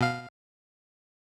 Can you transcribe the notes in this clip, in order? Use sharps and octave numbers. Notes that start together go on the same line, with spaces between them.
B2 F5